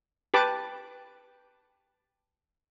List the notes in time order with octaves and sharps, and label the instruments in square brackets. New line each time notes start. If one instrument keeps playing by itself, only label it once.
[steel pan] G4 B4 A5 D6